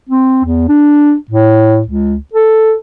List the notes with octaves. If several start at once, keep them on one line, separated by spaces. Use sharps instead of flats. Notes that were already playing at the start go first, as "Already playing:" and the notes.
C4
E2
D4
A2
C#2
A4